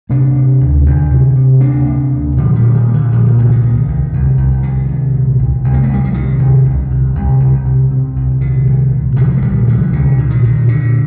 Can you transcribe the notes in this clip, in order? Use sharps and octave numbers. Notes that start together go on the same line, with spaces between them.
C3 A#3 D4
C3
D2
D2
C3
C3
D2 A#3 D4
C3
D2
A#2 D3 F3
D#3 G3
A#2
D#3
A#2
D3
A#2 F3
D#3
C2 D3
D#3
C2
C2
C2
C2
C2 D#3
C2
A#2
C2
C2
A#3
A3
C2 G3
F3
C3 D#3
C2
C2
C3
C2
C2
C3
C3
C2
A#2 D#3
C2
A#2
C2 D3 F3
A3
A#2 D#3 G3
C2 D3 F3
C2 D3
A#2
D#3
A#2
A#2 D3